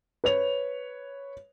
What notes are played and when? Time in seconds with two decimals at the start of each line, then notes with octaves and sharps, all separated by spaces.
0.24 B4 C#5 F7